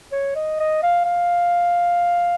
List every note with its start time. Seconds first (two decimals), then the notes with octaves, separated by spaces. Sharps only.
0.12 C#5
0.36 D#5
0.60 D#5
0.83 F5
1.05 F5